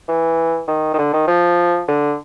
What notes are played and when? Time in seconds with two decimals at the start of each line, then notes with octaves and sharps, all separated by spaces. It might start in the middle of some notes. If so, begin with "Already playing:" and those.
0.08 E3
0.68 D#3
0.94 D#3
0.99 D3
1.13 D#3
1.27 F3
1.88 D3